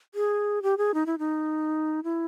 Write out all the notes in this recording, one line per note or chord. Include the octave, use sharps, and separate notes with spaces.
G#4
G4
G#4
D#4
E4
D#4
E4